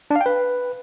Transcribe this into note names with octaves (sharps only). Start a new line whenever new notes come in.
D4
F5
G5
B4